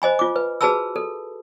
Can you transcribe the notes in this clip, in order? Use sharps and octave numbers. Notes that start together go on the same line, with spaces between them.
C5 D#5 G#5 B5
F4 D6
B4
F#4 G#4 B4 A5 B5 E6
A4